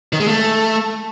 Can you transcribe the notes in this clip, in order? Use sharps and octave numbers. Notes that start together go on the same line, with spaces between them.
D#3
G#3
A3